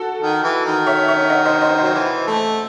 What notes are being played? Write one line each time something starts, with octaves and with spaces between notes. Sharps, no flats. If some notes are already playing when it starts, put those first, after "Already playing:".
Already playing: F#4 A4
D#3
E3
D#3
C#5 E5
C#5 E5
D#5 F#5
C5 D#5
C5 D#5
F#3 C5 D#5
E3
A3